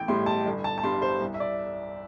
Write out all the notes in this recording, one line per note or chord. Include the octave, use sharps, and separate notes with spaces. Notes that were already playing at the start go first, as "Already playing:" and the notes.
Already playing: A1 G5
A2 G3 C6
A5
G1
A5
A5
G2 G3 C6
C5
C2
E5
D5